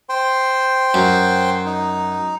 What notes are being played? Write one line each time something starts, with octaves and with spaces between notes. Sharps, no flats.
C5 G5 C6
F#2
D#4